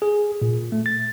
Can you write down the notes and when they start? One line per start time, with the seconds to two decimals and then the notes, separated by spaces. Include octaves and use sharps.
0.02 G#4
0.42 A#2
0.72 A3
0.86 A6